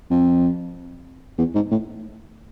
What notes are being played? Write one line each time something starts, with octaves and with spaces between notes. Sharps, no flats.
F2
E2
G#2
A2